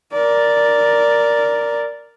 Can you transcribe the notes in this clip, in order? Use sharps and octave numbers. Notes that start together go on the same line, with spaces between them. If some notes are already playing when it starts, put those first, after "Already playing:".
A#4 D5